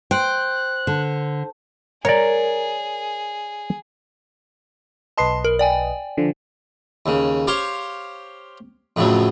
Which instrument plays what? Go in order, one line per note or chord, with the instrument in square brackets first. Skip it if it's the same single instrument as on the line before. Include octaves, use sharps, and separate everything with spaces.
[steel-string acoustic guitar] C5 [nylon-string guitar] G5 [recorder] F#6
[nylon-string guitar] D3
[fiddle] G#4 [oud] A#4 [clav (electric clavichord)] C#5 D5
[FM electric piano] B1 B4 D#5 [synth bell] A5 C6 C7
[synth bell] A#4
D5 G5 G#5
[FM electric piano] D3 F3
[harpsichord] D#2 C#3
G4 C5 C#5 F5 C6 C#6
F2 A2 C#3 F3 F#3